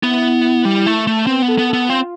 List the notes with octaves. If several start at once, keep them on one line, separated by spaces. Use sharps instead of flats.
B3 E4
G3
A3
A3
B3 C4
B3
A4
B3
B3 A4
C4 F4